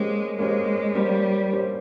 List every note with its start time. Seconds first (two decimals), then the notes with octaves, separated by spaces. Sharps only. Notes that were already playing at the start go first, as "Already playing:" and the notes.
Already playing: G#3 A#3 C#4 G4 C5
0.38 G#3 A#3 C#4 G4 C5
0.95 G3 A#3 C#4 G4 C5
1.51 A#3 C#4 G4 C5